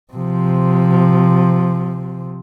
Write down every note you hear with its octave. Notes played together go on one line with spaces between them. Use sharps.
C3 F3